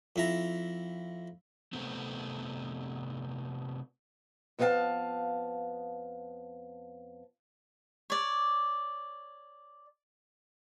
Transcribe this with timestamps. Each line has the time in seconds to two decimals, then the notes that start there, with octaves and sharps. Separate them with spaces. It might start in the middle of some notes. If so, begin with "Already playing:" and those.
0.16 F2 E4 A#5
1.73 C3 A3 B3 C4
4.59 F2 B3 D4 G#4 F5 A5
8.10 C#5 D5